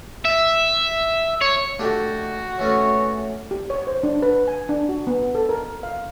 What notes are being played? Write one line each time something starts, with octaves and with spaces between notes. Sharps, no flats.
E5
C#5
A3 D4 F#4 G4
E3 A3 C#4 C#5
G4
C#5
C5
D4
B4
G#5
D4
F#4
B3
A4
A#4
F5